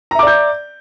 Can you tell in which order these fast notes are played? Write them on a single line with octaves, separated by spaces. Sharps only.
A#5 E5 D6 D5 G6